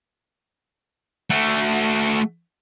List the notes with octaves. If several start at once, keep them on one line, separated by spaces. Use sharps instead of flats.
A3 F#4